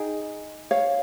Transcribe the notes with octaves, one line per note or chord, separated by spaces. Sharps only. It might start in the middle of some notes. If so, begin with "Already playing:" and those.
Already playing: D#4 G#4 D#5 G5
C#5 F5